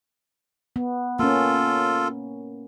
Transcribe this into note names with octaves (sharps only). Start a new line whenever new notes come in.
B3
A#3 C#4 F4 A4